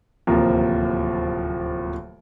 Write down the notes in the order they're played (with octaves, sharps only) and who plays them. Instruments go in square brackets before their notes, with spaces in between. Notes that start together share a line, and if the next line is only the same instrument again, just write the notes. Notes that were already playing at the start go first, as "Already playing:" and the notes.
[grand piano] D1 D#2 C3 F3 A#4